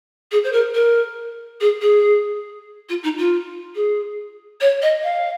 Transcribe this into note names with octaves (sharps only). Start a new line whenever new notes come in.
G#4
C5
A#4
A#4
G#4
G#4
F4
D#4
F4
G#4
C#5
D#5
F5